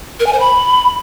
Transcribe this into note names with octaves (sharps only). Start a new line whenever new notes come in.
A#4
G#5
C5
B5